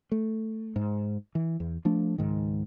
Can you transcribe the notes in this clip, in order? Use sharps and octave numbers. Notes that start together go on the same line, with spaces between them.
A3
G#2
E3
E2
F3 A3 D4
C#2 G#2 D#3